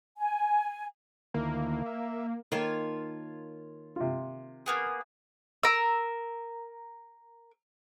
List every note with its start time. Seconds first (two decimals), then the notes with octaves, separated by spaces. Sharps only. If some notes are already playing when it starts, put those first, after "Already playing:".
0.17 G#5
1.34 D2 D#3 A#3 E4
1.86 E5
2.52 D#3 A#3 F4 C#5 A5
3.96 C3 F4
4.66 A#3 B3 G#4
5.63 A#4 E6